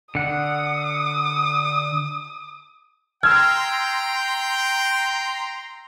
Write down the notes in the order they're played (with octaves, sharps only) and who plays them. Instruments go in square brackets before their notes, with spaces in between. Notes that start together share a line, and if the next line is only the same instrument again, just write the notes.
[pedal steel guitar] D3 F#5 [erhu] D#6
[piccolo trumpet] G5 [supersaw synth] A#5 C6 [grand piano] E6 G#6 [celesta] F6